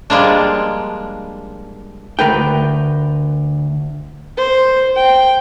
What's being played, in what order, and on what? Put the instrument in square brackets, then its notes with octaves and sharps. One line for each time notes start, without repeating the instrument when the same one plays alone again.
[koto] F3 G3 G#3 A#3 D4
[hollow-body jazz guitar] D2 A#4 B4 G5
[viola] C5
G5